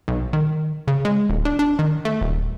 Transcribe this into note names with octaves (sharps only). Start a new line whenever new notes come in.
B1
D#3
C#3
G#3
D#1
D4
D4
D#3
A3
D#1